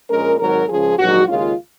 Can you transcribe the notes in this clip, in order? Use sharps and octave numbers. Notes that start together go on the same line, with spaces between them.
A#1 A#2 G#3 C#4 A#4
G#1 G#2 F#3 A#4
C#2 C#3 F3 G#4
A#1 G#2 D#3 F#3 F#4
D#2 C#3 G#3 C#4 F4